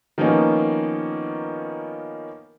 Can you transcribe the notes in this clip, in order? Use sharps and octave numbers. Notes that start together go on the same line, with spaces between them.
D#3 F3 A#3 B3 C#4 D#4